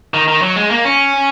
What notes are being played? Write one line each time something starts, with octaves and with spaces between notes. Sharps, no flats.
D#3
D#3
F#3
G#3
A#3
C#4